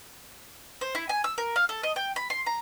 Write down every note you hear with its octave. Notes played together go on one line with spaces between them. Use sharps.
C5
E4
G#5
E6
A#4
F5
A4
D#5
G5
B5
C6
A#5